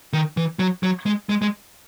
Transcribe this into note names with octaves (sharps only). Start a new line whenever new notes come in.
D#3
E3
F#3
F#3
G#3
G#3
G#3